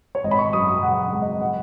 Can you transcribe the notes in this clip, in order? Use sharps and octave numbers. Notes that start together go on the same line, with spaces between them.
C#5
G#1 D#5
B5
C#6
F#2 D#6
D#6
C#3 F#5
F#5
G#3
D#5
F#5